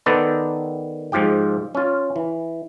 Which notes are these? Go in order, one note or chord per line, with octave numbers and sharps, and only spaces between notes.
D#3 B3 A4 B4 C5 D5
G#2 F3 F4 G4 G5
C#4 F4
E3